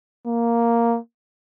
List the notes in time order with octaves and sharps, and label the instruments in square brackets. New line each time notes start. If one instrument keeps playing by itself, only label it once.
[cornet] A#3